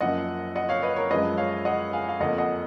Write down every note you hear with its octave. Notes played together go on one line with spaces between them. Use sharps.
F#2 F3 A#3 D#5 F#5
D#5 F#5
C#5 F5
B4 D#5
A#4 C#5
F#2 F3 G#3 B4 D#5
C#5 F5
D#5 F#5
F5 G#5
F5
F2 F3 A#3 D#5 F#5
D#5 F#5